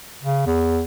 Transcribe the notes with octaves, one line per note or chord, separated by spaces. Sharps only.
C#3
E2